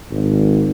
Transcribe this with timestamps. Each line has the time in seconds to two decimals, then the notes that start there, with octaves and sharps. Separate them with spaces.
0.11 G#1